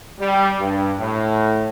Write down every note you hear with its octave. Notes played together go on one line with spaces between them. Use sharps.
G3
G2
A2